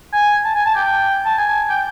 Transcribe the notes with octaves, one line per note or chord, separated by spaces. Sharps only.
G#5
A5
G#5
A5
G5
A5
G#5
G5